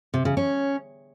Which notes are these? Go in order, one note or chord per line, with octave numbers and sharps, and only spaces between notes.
C3
C#3
C#4